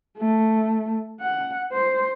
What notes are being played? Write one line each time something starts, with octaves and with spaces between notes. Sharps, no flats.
A3
F#5
C5